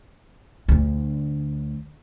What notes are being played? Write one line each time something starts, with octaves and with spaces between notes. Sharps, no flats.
D2 D3